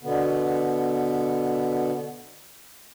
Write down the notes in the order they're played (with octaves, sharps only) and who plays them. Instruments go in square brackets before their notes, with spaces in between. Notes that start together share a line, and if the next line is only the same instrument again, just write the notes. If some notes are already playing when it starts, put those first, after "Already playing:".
[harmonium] B2 D3 B3